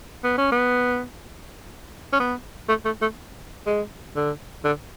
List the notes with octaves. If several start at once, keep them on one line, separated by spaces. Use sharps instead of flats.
B3
C#4
B3
C#4
B3
A3
A3
A3
G#3
D3
D3